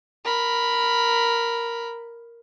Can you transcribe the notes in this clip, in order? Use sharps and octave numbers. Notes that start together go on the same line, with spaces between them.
A#4 B5